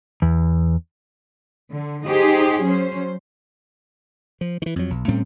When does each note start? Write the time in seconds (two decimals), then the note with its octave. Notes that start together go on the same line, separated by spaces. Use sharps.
0.22 E2
1.70 D3
2.06 D#4 G4 G#4 C5
2.63 F#3 C#4 C5
4.41 F3
4.62 D#3 E3
4.76 F2 F#3
4.90 B1
5.08 A2 G3 C4 C#4